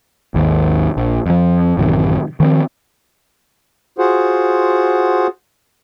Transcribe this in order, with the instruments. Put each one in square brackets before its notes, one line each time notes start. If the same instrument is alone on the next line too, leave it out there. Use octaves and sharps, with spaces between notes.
[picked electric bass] G#1 D#2
A#1
F2 F3
A1 F#2 C3 D#3
D#3 F3 A#3 C4
[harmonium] F4 F#4 G#4 C5 F#5